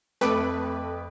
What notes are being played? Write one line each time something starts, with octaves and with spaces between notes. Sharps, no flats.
F2 A3 B4 D6 D7